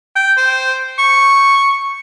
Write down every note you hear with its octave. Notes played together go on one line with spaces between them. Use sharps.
G5
C5
C#6